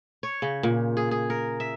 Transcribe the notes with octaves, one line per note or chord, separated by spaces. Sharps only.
C#5
C#3
A#2
G#4
G#4
A#4
E5